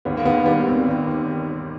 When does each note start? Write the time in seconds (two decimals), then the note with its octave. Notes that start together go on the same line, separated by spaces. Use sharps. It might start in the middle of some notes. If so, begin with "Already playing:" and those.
0.05 D#2 B3
0.17 A#3
0.25 D#3 B3
0.45 G3 B3
0.67 C4
0.87 D#2